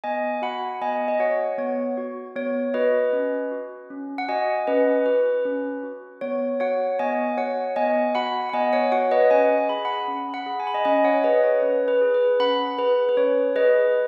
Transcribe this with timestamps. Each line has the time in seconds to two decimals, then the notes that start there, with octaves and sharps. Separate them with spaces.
0.04 B3 D#5 G#5
0.42 F#4 F#5 B5
0.81 B3 D#5 G#5
1.08 D#5
1.20 F#4 C#5 F#5
1.58 B3 C#5
1.97 F#4
2.36 B3 C#5
2.74 F#4 B4 D#5
3.13 C#4
3.51 F#4
3.90 C#4
4.18 F#5
4.29 F#4 D#5 G#5
4.67 C#4 B4 D#5
5.06 F#4 B4
5.45 C#4
5.83 F#4
6.21 B3 C#5
6.60 F#4 C#5 F#5
6.99 B3 D#5 G#5
7.37 F#4 C#5 F#5
7.76 B3 D#5 G#5
8.15 F#4 F#5 B5
8.49 F#5
8.53 B3 D#5 G#5
8.73 C#5 F#5
8.92 F#4 C#5 F#5
9.11 B4 D#5
9.30 C#4 D#5 G#5
9.69 G#4 B5
9.85 F#5 B5
10.08 C#4
10.34 F#5 B5
10.46 G#4
10.60 G#5
10.67 B5
10.74 D#5 G#5
10.85 C#4 D#5 G#5
11.04 C#5 F#5
11.23 G#4 B4 D#5
11.43 C#5
11.62 C#4 B4
11.88 B4
12.01 G#4
12.14 B4
12.40 C#4 F#5 B5
12.79 G#4 B4
13.09 B4
13.17 C#4 C#5
13.55 G#4 B4 D#5